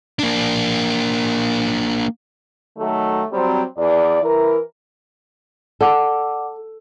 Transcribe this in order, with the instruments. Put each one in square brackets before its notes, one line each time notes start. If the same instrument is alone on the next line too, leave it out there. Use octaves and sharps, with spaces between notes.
[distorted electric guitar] A#3 D4
[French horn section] D#3 F#3 A3
F#3 G3 C4
E2 D5
E3 E4 A#4
[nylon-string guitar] A4 [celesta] D5 F#5 D6